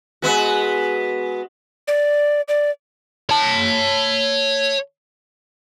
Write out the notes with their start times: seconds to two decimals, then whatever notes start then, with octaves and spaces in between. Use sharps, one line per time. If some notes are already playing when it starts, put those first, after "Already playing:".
0.22 G#3 B3 F#4
1.88 D5
2.48 D5
3.30 C#5 A5